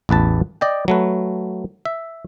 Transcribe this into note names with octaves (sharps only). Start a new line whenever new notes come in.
A1 E2 B4 A5
D5 D#5 G5
F#3 A3 B4
E5